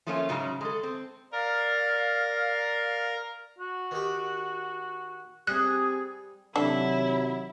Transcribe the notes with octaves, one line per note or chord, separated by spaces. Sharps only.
F3 A3 A#3 C#4 F4
G#2 C#3 F#3
G#3 A4
C4
A#4 D5 F5
F#4
D#3 G4
G3 C4 G4 G#4 F#6
C3 D#3 F#3 D4 E4 A4